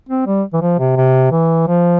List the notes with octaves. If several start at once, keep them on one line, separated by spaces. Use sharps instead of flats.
C4
G3
E3
F3
C3
C3
E3
F3